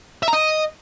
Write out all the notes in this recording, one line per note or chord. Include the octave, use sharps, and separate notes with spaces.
E5
A#5
D#5